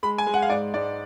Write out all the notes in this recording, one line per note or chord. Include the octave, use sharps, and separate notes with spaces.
G#3 B5
G#5
G#3
F#5
F5
G#2 D5
G#2 D5